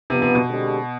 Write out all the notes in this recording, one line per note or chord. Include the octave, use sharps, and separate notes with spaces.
G2 C3 F3 B3
C3
B2
D3 G#3 C4 G4